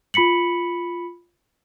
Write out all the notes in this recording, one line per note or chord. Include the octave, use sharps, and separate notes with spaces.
F4 B5 B6 C#7 F#7